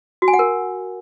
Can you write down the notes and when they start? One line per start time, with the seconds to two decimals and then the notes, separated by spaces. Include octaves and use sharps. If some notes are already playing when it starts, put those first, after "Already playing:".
0.22 F#4
0.28 G#5
0.33 F#5
0.39 A#4